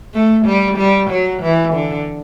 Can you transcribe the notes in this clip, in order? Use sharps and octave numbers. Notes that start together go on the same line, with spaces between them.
A3
G3
G3
F#3
E3
D3